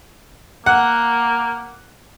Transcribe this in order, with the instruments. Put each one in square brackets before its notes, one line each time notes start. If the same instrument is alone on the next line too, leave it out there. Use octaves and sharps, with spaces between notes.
[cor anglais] A#3 [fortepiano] F#5